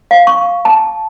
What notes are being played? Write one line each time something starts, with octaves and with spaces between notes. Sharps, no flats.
F5
C#6
A5